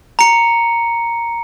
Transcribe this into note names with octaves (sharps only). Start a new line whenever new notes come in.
A#5 C#7